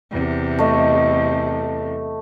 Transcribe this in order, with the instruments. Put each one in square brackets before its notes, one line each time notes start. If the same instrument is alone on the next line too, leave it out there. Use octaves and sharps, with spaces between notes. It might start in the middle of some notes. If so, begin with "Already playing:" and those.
[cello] E2 C3
[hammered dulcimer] A3 D#5